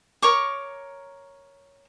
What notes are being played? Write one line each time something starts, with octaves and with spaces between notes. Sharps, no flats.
A#4 C#5 C#6 D6